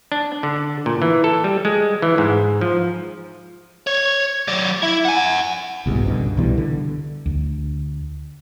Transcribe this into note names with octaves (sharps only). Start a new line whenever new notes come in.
D4
D3
A#2
E3
A4
G3
G#3
E3
G#2
F3
C#5
F#3 D5
E4
F#5 G#5
G1 C2 G#2 B2
C#2 G2 B2 D3
C2 B2 E3 G3
D3
D2